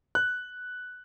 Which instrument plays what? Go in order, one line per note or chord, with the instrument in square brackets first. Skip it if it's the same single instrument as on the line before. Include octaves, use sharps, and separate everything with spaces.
[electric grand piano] F#6